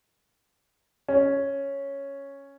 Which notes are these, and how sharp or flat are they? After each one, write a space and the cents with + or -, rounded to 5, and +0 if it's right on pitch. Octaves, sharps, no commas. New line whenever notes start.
C#4 +0